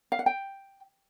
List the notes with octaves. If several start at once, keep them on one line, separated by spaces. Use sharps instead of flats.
F5
F#5
G5